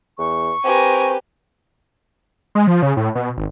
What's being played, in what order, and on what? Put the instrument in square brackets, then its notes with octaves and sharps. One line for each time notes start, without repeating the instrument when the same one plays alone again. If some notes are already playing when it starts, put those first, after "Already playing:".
[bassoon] E2 [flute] C#6
[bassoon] C4 [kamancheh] G4 B4 [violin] A#4 G#5
[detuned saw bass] G#3
F3
C#3
A2
B2
G#1